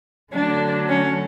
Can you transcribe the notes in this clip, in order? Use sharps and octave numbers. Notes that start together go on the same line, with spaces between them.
D3 F#3 A3 D4
C#4